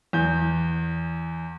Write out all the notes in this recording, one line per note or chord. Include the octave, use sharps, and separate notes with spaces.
E2 G6